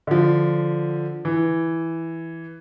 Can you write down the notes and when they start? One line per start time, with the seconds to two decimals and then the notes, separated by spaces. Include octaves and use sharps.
0.07 D3 F3
1.25 E3